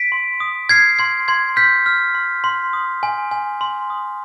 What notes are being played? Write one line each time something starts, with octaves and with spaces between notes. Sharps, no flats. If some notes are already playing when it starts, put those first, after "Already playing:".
Already playing: B6 D7
C6
D#6
F6 G#6 C7
C6 G#6
C6 G#6
F6 G6 B6
F6
C6
C6
D#6
G#5
G#5
C6
D#6